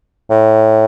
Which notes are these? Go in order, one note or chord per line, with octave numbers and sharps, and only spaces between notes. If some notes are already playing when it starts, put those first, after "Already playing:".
A2